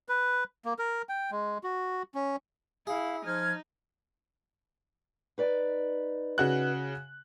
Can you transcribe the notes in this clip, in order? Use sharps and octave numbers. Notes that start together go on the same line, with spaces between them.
B4
A#3
A#4
G5
G#3
F#4
C#4
E4 G#4 F5
F3 D#4 F6 G#6
D#4 B4 D5
C#3 F#4 F#6